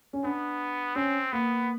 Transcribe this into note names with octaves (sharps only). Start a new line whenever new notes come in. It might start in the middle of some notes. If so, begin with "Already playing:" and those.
C#4
B3 D4
C4 C#4
A#3 B3